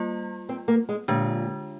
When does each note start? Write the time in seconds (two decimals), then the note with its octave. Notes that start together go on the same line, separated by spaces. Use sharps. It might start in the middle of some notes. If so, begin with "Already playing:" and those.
Already playing: G3 A#3 F4
0.49 C4
0.68 A#3
0.89 G#3
1.08 A#2 D3 G#3 D4 F4